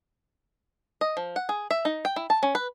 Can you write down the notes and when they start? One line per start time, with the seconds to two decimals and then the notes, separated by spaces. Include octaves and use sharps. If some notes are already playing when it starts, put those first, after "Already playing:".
1.01 D#5
1.17 F3
1.36 F#5
1.49 G#4
1.71 E5
1.85 D#4
2.05 G5
2.16 E4
2.30 A5
2.43 C#4
2.55 B4